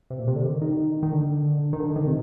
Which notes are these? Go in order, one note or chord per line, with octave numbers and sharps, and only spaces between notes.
C3
A#2
C3
D3
D#3
D#3
D#3
D3
D#3
D3
D#3
C3